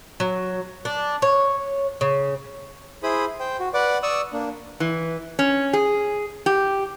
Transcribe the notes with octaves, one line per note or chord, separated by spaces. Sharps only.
F#3
D4
C#5
C#3
E4 G#4 C5 B5 D#6
C5 G5
F#4
B4 D5 F#5 D6
D5 C#6 D#6 E6
A#3 D4
E3
C#4
G#4
G4